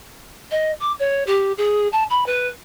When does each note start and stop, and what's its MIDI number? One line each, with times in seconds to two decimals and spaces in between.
0.51 0.72 75
0.80 0.92 86
0.99 1.24 73
1.27 1.53 67
1.58 1.88 68
1.93 2.04 81
2.10 2.26 83
2.26 2.48 71